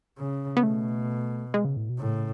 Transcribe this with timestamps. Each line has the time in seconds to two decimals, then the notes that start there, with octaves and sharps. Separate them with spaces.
0.18 C#3
0.57 B3
0.63 B2 A3
1.54 G#3
1.65 C#3
1.77 A2
1.90 B2
1.99 A2 C#3